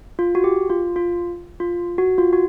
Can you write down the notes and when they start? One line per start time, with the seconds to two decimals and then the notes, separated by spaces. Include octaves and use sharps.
0.19 F4
0.35 F#4
0.44 G4
0.70 F4
0.96 F4
1.60 F4
1.98 F#4
2.18 F4
2.33 F#4